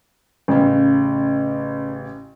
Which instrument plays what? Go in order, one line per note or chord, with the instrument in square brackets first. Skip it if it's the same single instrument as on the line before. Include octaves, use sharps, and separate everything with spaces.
[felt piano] A1 C#3